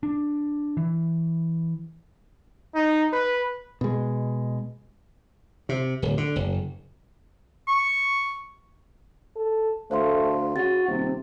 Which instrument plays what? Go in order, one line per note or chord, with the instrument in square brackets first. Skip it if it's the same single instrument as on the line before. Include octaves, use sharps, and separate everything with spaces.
[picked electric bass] D4
E3
[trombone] D#4
B4
[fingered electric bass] B2 G#3
[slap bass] C3
D1
D3
F#1
[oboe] C#6
[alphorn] A4
[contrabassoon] D2 [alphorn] A3 [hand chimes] C5 F5 C6
[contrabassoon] C#3 [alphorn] F#4 [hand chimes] A6
[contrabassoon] D#1 [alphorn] C3